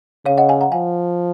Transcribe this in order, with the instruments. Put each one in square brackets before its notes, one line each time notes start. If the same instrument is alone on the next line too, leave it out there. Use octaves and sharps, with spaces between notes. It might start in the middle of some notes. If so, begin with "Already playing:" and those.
[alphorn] C#3 [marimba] C#5 F5
[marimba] D#5 F#5
F5 G#5
F#5 A#5
[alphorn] F3 [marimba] F5 G#5